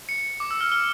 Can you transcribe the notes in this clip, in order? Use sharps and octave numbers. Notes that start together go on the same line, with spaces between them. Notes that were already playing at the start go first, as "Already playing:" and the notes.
C#7
D6
E6
F6
F6